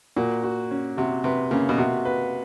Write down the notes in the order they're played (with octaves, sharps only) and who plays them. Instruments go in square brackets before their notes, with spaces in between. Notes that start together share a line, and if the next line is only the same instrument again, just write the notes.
[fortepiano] A#2 [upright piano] F#4
[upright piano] F#4
C#4
[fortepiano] C3 [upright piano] F#4
[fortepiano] C3 [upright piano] B4
[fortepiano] C#3 [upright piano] A#3
[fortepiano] B2
[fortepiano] C3 [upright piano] F#4
[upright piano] B4